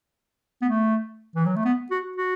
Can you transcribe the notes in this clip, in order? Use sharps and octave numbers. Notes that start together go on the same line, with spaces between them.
B3
A3
E3
F#3
A3
B3
F#4
F#4